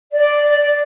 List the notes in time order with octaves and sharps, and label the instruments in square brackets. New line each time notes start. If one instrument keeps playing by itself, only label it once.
[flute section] D5